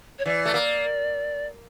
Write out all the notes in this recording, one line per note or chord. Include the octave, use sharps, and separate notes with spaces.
C#5
E3 D5
A3
A#3